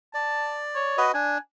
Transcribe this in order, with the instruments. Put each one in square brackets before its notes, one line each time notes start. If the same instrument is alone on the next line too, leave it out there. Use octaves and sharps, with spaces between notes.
[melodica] D5 [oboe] A5
[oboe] C#5
[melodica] F#4 B4 D#5
[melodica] D4 [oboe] G#5